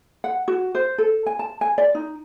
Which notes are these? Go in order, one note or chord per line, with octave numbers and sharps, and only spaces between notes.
F#5
F#4
C5
A4
G#5
A5
G#5
D5
D#4